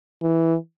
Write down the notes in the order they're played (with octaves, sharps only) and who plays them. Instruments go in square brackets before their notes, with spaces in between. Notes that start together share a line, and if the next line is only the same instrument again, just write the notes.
[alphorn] E3